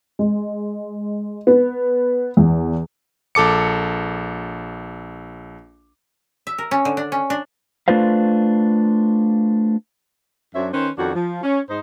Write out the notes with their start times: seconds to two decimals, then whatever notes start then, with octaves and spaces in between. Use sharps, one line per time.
0.19 G#3
1.47 B3
2.37 E2
3.35 A#1 A4 D6 C#7
6.47 E5
6.58 A#4
6.71 C#4
6.85 D3
6.97 D4
7.12 C#4
7.30 D4
7.88 A3 D4 F4 B4 C5 F5
10.55 F#2 F#3 D4 C5 C#5 E5
10.73 D#3 C#4 B4 C5
10.98 F2 D#3 C#4 D4 F#4
11.15 F3
11.43 C#4
11.70 G#2 D#4 C5